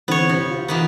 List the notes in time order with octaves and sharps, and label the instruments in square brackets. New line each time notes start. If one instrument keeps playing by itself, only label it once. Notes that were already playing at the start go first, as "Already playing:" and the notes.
[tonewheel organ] D3 E3 C4 [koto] B3 C#5
[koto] C3
[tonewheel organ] F4
[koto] D#3 E3 B3